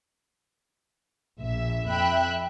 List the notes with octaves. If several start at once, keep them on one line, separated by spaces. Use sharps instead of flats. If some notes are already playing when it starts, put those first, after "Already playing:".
A#1 E5
F2 E5 G5 B5 F#6